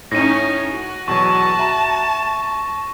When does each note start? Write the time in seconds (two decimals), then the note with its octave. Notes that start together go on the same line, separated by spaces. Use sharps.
0.11 A2 C#4 D#4 A#6 D#7
0.73 F#4
1.08 E2 B2 F#3 A5 C#6
1.59 E5 A#5